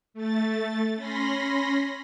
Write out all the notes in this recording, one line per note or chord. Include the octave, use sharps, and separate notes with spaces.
A3 A6
C#4 B5 C6 A#6